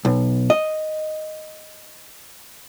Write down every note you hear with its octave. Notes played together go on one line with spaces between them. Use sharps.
B1
D#5